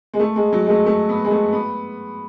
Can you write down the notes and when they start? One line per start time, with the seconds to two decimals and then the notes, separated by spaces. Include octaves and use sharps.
0.13 G#3
0.20 A3
0.36 G#3
0.53 F#3
0.66 G#3
0.70 A3
0.86 A3
1.09 B3
1.25 G#3
1.31 A3
1.52 B3